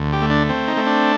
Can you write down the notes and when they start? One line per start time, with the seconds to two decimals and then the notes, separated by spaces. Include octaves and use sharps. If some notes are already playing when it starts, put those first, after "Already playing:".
Already playing: D2
0.13 G4
0.22 A3
0.30 D4
0.49 C4
0.68 D#4
0.77 A3
0.86 D4